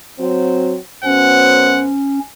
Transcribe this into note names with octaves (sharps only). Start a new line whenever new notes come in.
F#3 C4
F#2 B3 C#4 C5 F#5